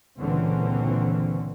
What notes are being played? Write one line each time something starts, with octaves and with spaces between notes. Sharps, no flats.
C#2 A#2 D3 E3 C4 C#4